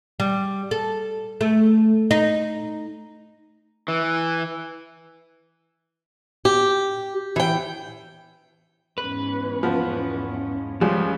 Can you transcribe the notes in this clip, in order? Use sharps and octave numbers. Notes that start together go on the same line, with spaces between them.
G3
A4
A3
D#4
E3
G4
E3 G5
E2 G#2 C#4 B4
F3 B3
C#2 F3 G3 G#3 C#4 B4